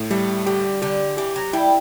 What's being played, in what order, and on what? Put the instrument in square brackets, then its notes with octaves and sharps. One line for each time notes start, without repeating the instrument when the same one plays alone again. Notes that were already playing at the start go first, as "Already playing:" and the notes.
Already playing: [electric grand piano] A2
[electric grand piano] G3 [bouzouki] A3
[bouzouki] D3 [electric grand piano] G4
[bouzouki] D3 [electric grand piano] G4
[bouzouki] E3 [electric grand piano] G4
[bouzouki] F#3
[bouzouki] G3 [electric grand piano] E4